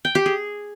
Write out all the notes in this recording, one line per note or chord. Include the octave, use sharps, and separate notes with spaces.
G5
G4
G#4